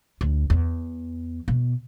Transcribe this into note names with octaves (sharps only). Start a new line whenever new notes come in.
D2
E2
B2